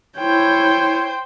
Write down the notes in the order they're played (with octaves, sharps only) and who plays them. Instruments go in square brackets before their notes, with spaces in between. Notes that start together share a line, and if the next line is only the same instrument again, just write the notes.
[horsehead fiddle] E4 C#5 [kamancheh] C5 G5